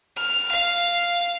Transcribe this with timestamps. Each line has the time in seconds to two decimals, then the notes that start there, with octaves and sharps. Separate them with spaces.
0.17 F6
0.51 F5